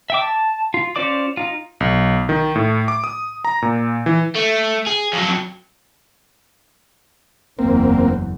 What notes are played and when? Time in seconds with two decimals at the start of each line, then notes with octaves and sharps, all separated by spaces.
0.10 E5 G5 D6
0.21 A5
0.74 F4
0.96 C#4 F4 C5 D5 D6
1.37 D#4 F4
1.80 B1
2.29 D#3
2.56 A2
2.88 D6
3.04 D#6
3.45 A#5
3.62 A#2
4.06 E3
4.36 A3
4.86 G#4
5.13 F2 F#3
7.59 F#1 E2 A#3 C4